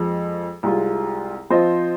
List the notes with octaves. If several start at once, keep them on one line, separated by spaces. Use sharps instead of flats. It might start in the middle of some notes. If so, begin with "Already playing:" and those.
Already playing: F2 F3 G#3
C2 C3 G#3 F4
F3 C4 F4 C5 D#5